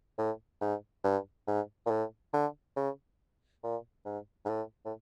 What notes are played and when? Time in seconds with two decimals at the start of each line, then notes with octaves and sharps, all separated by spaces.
0.18 A2
0.61 G#2
1.04 G2
1.48 G#2
1.86 A#2
1.91 A2
2.33 D3
2.76 C#3
3.64 A#2
4.05 G#2
4.45 G#2
4.49 A2
4.85 A2